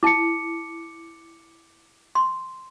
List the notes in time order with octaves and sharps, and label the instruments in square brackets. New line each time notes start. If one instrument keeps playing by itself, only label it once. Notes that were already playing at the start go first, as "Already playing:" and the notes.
[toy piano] E4 A5 [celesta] D6 C#7
[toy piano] C6